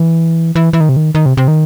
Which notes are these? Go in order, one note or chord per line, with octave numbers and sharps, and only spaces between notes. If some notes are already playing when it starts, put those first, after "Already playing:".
Already playing: E3
E3
E3
D#3
C3
D#3
D#3
C3
C3
D#3